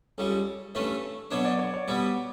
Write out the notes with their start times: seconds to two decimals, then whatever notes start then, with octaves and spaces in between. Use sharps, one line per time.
0.18 C#2 C#3 G3 A4
0.75 G2 E3 A3 C#4
1.31 B2 F#3 B3 D4 C#5
1.45 D5
1.59 C#5
1.74 C#5
1.88 B2 G3 B3